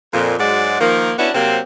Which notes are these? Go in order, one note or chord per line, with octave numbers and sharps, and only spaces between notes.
F2 A#2
G#2 F#3 G#3 F#4 D5
D#3 F3 A#3
B3 C#4 D4 E4 F#4
C3 F#3 A#3 C4